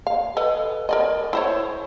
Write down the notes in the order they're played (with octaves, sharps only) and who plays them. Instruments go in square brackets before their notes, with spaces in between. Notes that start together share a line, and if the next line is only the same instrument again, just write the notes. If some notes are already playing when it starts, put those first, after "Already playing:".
[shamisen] F5
A4 B4 D#5
A#4 D5 D#5
E4 C5 C#5